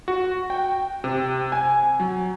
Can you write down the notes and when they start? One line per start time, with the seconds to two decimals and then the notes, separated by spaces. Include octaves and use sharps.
0.08 F#4
0.50 G5
1.04 C3
1.52 G#5
2.00 F#3